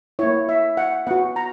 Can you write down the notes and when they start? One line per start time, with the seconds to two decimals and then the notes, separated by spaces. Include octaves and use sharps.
0.19 A#3 E4 C#5
0.49 E5
0.77 F#5
1.07 B3 F#4 F#5
1.36 A#5